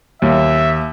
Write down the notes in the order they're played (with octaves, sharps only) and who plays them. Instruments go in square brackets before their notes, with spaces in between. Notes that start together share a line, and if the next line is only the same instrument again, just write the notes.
[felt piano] D#2 [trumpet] E5